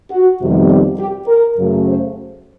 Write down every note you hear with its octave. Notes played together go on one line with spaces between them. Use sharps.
F#4
F2 C3 D#3 G3 B3
G4
G4
A#4
F#2 C#3 F#3 A3
C5